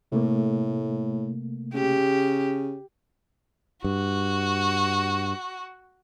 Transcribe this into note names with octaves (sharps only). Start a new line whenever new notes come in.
A2 C3 A3 A#3
C#3 G4
G2 F#4